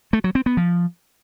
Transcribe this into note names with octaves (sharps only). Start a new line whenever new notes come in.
A3
F#3
C4
B3
F3